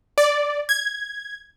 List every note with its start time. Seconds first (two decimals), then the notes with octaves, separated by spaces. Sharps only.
0.18 D5
0.69 G#6